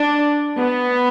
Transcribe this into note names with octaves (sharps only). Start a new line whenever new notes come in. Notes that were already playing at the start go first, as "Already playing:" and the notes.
Already playing: D4
B3